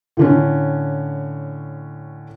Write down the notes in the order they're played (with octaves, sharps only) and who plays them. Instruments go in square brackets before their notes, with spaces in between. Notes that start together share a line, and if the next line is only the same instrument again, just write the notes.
[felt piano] A2 D3 C#4